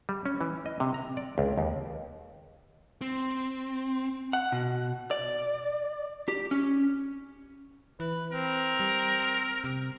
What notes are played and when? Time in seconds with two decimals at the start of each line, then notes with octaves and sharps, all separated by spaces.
0.09 G3
0.25 C#4
0.41 E3
0.66 D#5
0.80 C3
0.94 A#5
1.17 D5
1.38 C#2
1.58 D#2
3.01 C4
4.33 F#5
4.52 B2
5.11 D5
6.28 G4
6.51 C#4
8.00 E3 B4
8.33 C4 A#4
8.80 G3
9.64 C3